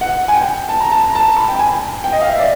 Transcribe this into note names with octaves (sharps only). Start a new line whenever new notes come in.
F#5
G#5
G5
A5
A#5
A5
A#5
A5
B5
G5
G#5
G#5
G5
D#5
F5
E5
D5